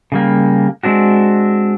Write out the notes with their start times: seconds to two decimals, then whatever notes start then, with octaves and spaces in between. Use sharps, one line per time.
0.12 C#3 G3 A#3
0.83 G#3 C4 D4 F#4